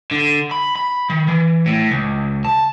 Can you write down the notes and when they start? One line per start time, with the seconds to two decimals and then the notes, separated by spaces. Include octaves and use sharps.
0.11 D3
0.51 B5
0.76 B5
1.10 D#3
1.27 E3
1.66 A2
1.91 C#2
2.45 A5